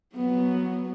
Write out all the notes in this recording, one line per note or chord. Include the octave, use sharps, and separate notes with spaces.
F#3 B3